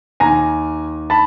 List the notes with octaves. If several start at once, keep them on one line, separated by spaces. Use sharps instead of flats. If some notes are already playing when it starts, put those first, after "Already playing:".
D#2 D#3 G#5 A#5
A5 B5